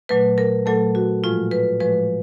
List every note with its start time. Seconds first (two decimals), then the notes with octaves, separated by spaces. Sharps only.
0.09 A#2 F#3 A3 B4
0.38 A#4
0.66 A#2 F#3 A3 A4
0.95 F#4
1.24 A2 F3 G#3 F4
1.51 B4
1.80 A2 F3 G#3 B4